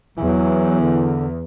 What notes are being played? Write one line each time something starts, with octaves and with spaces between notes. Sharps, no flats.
E2 E3 F#3
D3